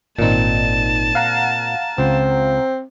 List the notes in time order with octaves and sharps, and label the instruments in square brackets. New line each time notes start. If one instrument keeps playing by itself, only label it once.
[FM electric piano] G#1 D#4 [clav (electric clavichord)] A#2 C4 [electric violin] A5
[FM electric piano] F5 F#5 A#5
[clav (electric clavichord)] C#2 [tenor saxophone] C4